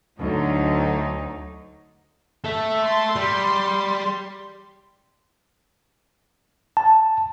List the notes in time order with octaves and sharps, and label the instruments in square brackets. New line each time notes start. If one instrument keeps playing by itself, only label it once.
[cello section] D2 F#3 D#4
[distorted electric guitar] A4 E5
[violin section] C6
[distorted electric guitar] G3
[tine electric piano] A5